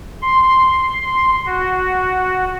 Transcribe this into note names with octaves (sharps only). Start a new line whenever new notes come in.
C6
F#4